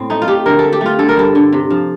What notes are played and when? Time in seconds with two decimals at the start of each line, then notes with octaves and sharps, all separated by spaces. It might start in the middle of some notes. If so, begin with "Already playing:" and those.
Already playing: A2 C4
0.10 A3 D#4
0.22 F4
0.28 A3 G4
0.46 D3 A#4
0.59 A3 A4
0.73 G4
0.81 A3 F4
0.99 D3 A4
1.09 A#4
1.17 G2 A4
1.35 D3
1.53 C3
1.70 F3